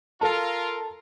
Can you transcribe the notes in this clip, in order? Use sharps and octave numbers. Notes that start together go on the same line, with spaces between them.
F4 A4 A#4 A5